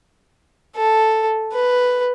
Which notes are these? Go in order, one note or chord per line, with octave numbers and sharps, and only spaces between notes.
A4
B4